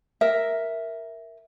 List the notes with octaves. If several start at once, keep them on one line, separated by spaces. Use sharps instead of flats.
A#4 E5